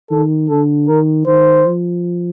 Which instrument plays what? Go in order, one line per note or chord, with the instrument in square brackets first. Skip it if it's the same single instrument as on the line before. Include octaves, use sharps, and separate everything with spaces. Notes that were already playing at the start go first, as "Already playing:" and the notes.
[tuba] D#3 [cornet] A4
[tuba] D3 [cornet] A4
[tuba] D#3 [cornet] A#4
[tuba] D#3 [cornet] C5
[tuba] F3